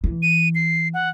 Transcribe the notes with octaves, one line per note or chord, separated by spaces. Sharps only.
E3
D#7
C7
F#5